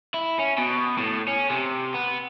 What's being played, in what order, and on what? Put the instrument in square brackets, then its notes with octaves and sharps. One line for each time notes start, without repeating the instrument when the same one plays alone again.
[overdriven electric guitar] E4
C#4
B2
A2
C#4
C3
B3